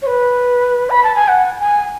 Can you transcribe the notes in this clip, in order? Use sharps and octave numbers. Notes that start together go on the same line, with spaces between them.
C#5
B4
B5
A5
G#5
F#5
G#5